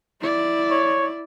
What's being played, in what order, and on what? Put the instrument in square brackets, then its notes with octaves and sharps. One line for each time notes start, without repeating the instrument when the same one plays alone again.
[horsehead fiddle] E4 D5
[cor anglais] C#5